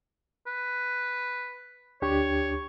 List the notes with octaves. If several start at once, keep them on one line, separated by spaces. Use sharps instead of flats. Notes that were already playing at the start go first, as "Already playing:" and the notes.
B4
D2 D4 G4 C#5